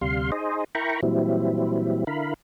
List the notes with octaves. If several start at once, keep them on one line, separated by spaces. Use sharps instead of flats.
D2 C3 G3 F5 C6
D#4 G#4 C5 D#5
E4 A#4 G5 A#5 B5 C#6
A#2 E3 F#3 G3 C4 E4
D3 E4 A#4 F5 B5